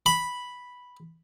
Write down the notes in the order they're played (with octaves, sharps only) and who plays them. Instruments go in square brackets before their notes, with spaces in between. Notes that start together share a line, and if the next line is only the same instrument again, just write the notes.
[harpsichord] B5